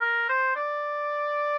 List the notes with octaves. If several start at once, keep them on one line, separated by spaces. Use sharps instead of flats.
A#4
C5
D5